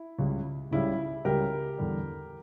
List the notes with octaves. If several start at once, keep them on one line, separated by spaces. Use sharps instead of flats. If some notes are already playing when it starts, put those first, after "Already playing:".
Already playing: E4
C#2 C#3 G3
C#2 C#3 G3 E4
C#2 C#3 G3 G4 A#4
E2 D3 G3